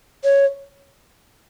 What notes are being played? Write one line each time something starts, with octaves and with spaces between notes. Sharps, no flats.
C#5